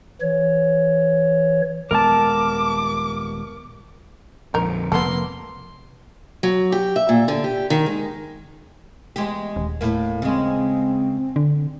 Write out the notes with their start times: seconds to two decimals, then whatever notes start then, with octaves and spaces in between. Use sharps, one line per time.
0.21 E3 C#5
1.91 D#1 G#3 B3 A#4 A5 D6
4.54 A#1 F2 D3 D#4 A#4
4.92 F1 A#3 B3 A4 C6
6.43 F#3
6.72 G4
6.96 E5
7.09 A#2
7.28 D3
7.44 G4
7.70 D#3
7.86 G#3
9.16 E2 G#3 G4
9.56 D#1
9.81 A2 A#3
10.22 C#3 G#3 C4
11.36 D3